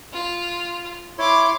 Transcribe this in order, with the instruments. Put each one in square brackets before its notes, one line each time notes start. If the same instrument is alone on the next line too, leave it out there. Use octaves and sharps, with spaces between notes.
[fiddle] F4
[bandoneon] E4 C#5 [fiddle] C6 D6